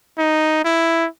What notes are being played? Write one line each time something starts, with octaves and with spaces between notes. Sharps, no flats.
D#4
E4